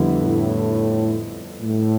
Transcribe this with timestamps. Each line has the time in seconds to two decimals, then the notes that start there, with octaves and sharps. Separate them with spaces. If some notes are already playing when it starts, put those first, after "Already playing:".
Already playing: F2 D3 G3 B3 E4
0.21 A2
1.61 A2